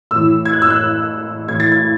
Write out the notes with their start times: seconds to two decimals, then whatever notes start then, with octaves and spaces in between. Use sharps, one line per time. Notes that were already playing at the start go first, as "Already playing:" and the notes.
0.11 A2 E3 E6
0.45 G#6
0.53 F#6
0.62 E6
0.70 F#6
1.48 A2 E3 G#6
1.60 A6
1.72 G#6